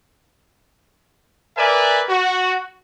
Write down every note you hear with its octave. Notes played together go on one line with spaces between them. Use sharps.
A#4 B4 D5 E5 G#5
F#4